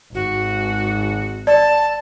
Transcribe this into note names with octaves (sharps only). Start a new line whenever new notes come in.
G#1 F#4
D5 A5